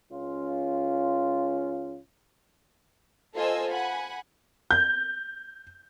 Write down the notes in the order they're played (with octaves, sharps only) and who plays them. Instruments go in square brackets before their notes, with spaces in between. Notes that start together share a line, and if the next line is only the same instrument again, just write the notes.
[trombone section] C#2 C#4 F4
[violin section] F4 A4 C5 D#5 G#5 E6
F#5 G#5 B5
[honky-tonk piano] G6